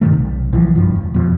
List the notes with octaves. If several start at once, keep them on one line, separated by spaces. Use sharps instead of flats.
G2 C3 D#3 A3
B1
B1 E3 F3
F#1 G2 F3
E1
F2 B2 F3